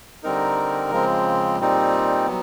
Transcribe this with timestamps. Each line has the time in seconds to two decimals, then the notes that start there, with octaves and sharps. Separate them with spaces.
0.23 D3 G3 C4 D#4 A#4
0.91 C#3 F3 G#3 C4
1.59 A#2 G3 C4 D#4
2.27 F#3 B3